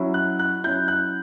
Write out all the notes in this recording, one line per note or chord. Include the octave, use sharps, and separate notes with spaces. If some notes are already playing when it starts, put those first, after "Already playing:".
Already playing: F#3 C#4 E4
F#6
F#6
F#3 C#4 E4 G6
F#6